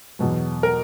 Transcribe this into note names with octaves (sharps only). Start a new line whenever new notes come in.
E2 B2 F#3
A#4